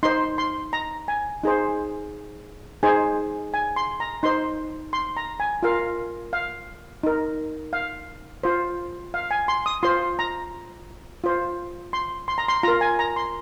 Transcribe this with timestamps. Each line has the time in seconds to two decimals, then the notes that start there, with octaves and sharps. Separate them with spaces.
0.03 D#4 C5 C6
0.38 C6
0.73 A#5
1.08 G#5
1.43 D#4 G#4 C5
2.83 D#4 G#4 C5 G#5
3.54 G#5
3.76 C6
4.00 A#5
4.23 D#4 C5 C6
4.93 C6
5.17 A#5
5.40 G#5
5.63 F4 A#4 F5
6.33 F5
7.03 D#4 A#4
7.73 F5
8.43 F4 C5
9.14 F5
9.31 G#5
9.48 C6
9.66 D#6
9.83 F4 C5 C6
10.19 A#5
11.24 F4 C5
11.93 C6
12.28 C6
12.38 A#5
12.48 C6
12.63 F4 A#5
12.68 A#4
12.81 G#5
12.99 A#5
13.16 C6